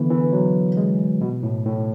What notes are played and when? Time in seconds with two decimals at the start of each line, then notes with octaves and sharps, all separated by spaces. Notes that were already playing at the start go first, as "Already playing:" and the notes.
Already playing: D3 E3 B3
0.10 E3
0.32 F#3
0.77 G#3
1.21 B2
1.43 A2
1.65 A2